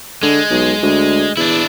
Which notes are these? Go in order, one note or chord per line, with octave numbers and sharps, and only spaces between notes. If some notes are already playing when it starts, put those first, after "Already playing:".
D3 G#3
B1
D2
E2 D4 E4